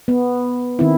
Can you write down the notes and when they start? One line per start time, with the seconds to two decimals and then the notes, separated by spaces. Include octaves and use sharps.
0.08 B3
0.79 D#3 C4 E4